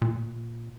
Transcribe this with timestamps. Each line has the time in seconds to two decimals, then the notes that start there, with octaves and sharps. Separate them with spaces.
0.02 A#2